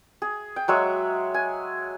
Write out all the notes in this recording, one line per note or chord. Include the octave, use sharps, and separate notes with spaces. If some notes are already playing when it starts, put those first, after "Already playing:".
G#4
G5
F#3 G#3 E5 C#6
G#5